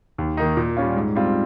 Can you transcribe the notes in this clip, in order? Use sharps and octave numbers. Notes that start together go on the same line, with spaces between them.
D#2
D#3 A#3 D#4
A#2
G3 C#4 F4
G#2
G3 C4 F4